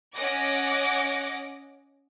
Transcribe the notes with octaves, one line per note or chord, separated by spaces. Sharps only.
C#4 D#5 F#5 D6 A#6